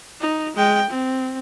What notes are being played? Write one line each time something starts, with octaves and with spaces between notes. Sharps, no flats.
D#4
G#3 G5
C4